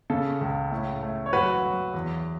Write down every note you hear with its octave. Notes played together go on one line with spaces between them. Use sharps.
C#3 A4
C#2
A2
A3
C#5
F#3 F#4 B4
F#3
E2